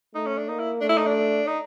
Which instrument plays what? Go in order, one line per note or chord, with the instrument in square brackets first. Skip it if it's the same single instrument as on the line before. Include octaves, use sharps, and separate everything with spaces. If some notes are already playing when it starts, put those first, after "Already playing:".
[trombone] A3 [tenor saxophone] D#4
[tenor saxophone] C#4
D4
[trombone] A#3 [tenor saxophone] D#4
[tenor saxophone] E4
[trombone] A3 [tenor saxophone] D4
[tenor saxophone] E4
D#4
D4
D#4